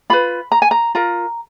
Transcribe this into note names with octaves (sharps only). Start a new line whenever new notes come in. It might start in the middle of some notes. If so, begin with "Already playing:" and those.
F4 B4 B5
A#5
G#5
A#5
F4 A#4 A#5